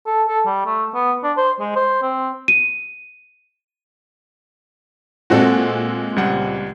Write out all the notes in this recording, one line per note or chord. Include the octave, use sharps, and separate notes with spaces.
A4
A4
G3
A3
B3
D4
C5
G#3
C5
C4
D#7
A#2 G#3 C4 F#4 A4
C#2 G3 F#5